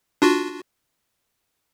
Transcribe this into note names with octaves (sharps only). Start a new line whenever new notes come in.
D4 F4 F#4